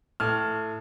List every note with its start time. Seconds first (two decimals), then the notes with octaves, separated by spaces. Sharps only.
0.20 A2 F6